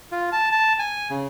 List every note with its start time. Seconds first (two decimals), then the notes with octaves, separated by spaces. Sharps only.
0.12 F4
0.32 A5
0.52 A5
0.79 G#5
1.10 C#3